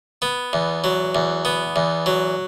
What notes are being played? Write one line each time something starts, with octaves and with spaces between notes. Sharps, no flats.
B3
E2
F#3
E2
B3
E2
F#3